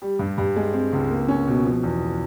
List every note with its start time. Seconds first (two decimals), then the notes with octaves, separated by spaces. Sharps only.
0.02 G3
0.19 G2
0.38 G2
0.56 G#3
0.73 C4
0.93 C#2
1.10 A#3
1.28 C#4
1.47 B2
1.65 F3
1.83 E2